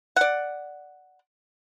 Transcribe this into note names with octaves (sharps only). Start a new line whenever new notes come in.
D5 F#5